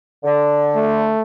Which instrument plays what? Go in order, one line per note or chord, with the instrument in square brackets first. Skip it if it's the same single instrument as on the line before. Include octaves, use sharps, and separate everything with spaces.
[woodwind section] D3
[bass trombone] A3